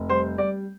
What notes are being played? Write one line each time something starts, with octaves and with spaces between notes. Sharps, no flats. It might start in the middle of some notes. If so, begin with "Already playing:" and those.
Already playing: F1
G3 C5
G3 D5